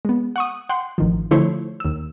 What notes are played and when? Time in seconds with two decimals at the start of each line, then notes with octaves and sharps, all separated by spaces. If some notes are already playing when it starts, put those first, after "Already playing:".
0.05 G#3 B3
0.36 F#5 C#6 D#6
0.69 F#5 G5 C6
0.98 A1 D#3 F3
1.31 D3 F3 A3 E4 C5 C#5
1.80 D#2 E6